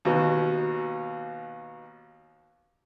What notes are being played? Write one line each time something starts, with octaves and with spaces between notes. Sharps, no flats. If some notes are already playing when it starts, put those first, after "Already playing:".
D#2 B2